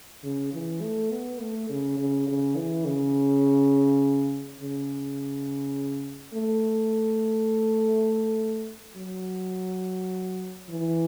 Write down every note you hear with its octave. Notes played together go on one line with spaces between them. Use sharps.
C#3
E3
A3
B3
A3
C#3
C#3
C#3
E3
C#3
C#3
A3
F#3
E3